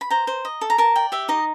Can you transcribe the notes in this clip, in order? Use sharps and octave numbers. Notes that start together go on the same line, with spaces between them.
B5
C5 A#5
C5
D#5
A4
A#5
A#4 A5
D5 G5
G4 E5
D#4 D#5